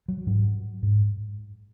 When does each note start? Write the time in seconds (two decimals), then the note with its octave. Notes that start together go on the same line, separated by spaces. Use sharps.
0.08 F#3
0.27 G#2 F#3
0.83 G#2